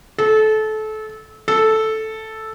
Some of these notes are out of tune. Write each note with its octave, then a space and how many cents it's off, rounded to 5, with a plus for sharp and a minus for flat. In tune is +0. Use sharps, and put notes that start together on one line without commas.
A4 -25
A4 -5